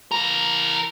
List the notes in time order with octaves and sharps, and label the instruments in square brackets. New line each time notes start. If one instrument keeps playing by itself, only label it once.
[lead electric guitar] E3 A#4